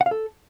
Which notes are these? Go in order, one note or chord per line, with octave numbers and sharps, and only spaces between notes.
F#5
F5
A4